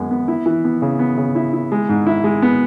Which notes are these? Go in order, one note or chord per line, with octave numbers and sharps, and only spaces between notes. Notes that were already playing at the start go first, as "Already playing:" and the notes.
Already playing: F#2 G#3 B3
B3
E4
E3
B3
C#3
B3
C#3
E4
E4
G#3
G#2
E4
G#3
B3